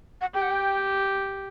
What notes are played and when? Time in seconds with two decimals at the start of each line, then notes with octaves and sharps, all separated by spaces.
0.21 F#5
0.34 G4 G5
0.42 F#5
0.51 G5